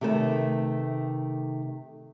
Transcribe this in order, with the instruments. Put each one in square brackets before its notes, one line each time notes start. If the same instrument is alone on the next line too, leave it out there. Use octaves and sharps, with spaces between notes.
[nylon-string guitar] C3 D#3 A3 A#4 B4 A5